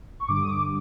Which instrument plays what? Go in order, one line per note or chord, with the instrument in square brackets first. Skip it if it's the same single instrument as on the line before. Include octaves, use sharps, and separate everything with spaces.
[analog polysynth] C#6
G2 D3 G3 D6
D#6
D6